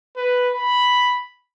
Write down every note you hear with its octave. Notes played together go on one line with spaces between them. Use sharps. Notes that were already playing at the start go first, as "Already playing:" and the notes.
B4
B5